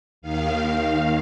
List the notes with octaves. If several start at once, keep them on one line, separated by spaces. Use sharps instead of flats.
D#2 D#3 F5
F5